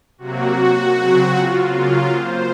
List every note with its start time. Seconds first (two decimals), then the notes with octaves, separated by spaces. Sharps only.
0.18 C3 F#3 A#3 F#4
0.94 C#3 F#3 C4
1.32 F4
1.70 C#3 F#3 A#3 F4
2.08 C5